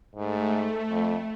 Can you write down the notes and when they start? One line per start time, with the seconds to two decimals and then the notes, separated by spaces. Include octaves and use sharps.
0.16 G#2 A3
0.91 F2